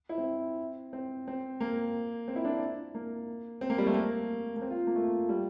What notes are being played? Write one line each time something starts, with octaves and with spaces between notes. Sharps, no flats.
E4
C4
C4
C4
A#3
C4
E4
D4
A#3
C4
A#3
G3
A3
A#3
A#3
C4
F4
A#3
A3
G3